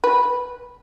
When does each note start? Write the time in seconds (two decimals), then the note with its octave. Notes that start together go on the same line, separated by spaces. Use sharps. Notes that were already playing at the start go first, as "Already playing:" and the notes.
0.04 B4